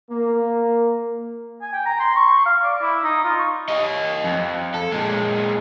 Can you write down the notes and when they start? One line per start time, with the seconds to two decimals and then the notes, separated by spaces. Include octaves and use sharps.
0.11 A#3
1.62 G#5
1.73 G5
1.86 A#5
2.00 C6
2.16 C#6
2.46 F5
2.63 D5
2.82 E4
3.04 D#4
3.24 F4
3.39 C#6
3.69 G4 D#5
4.24 F2
4.74 A4
4.92 A#2 G#3